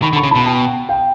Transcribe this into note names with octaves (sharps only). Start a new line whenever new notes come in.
D#3 B5 C#6
D3
B5 C#6
C#3
B2 A5 B5
G5 A5
F5 G5